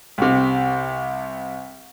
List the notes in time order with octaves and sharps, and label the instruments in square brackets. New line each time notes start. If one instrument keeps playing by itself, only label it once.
[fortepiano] C2 C3